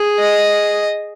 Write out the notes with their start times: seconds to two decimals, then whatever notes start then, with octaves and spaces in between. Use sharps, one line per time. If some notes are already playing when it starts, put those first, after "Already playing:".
Already playing: G#4
0.20 D#5